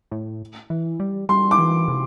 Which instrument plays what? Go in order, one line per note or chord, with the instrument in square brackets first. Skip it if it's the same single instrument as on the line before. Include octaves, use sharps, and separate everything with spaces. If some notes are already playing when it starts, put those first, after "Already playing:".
[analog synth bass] A2
E3
G3
[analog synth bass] G3 [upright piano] C6
[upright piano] D6
[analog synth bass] E3
C3